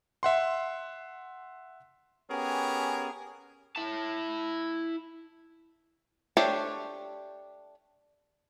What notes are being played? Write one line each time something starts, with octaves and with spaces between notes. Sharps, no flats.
E5 F#5 C6
B3 C#4 G4 G#4 A#4
E4 A5
A3 D4 G4 C5 C#5